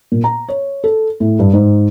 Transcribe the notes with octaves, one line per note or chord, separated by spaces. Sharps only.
A#2
A#5
C#5
A4
A2
G2
G#2